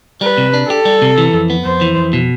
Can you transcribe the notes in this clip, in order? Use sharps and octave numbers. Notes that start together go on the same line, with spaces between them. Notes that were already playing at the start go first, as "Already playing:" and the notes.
G3 B4
C3
D4
G4 A4
G3
C3
E3
F2
B3
F2 C5
E3
F2
B2